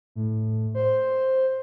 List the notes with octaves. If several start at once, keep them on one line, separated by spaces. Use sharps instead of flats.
A2
C5